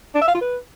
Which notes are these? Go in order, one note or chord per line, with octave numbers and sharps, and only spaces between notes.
D4
E5
F5
F4
B4